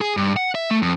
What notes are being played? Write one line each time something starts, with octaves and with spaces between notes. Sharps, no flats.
G#4
G2
F#5
E5
A3
F2